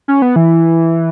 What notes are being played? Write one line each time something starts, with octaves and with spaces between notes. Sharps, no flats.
C#4
B3
E3